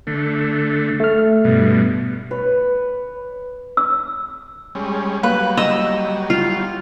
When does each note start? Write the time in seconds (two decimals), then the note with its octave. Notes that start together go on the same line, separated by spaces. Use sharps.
0.07 D3 A3
1.00 A3 F6
1.45 G2 B2
2.31 B4 C#5
3.77 E6
4.75 G3 G#3 C#4
5.23 F#3 G3 A#3 B4
5.57 D#5 E6
6.30 F4